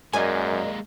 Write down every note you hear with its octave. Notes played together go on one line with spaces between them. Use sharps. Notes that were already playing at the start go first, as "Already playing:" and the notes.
F#2 G#3 A#3 A#4 D5 D#5 G#5